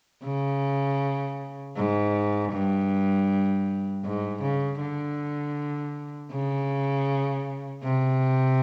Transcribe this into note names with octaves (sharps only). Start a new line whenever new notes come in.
C#3
G#2
G2
G#2
C#3
D3
C#3
C3